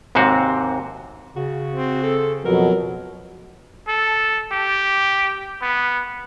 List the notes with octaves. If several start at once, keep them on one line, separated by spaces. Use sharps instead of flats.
D#2 G#2 C3 C4 F#4
C#3 F#4
C4
A4
F2 B2 F#3 A#4
A4
G4
B3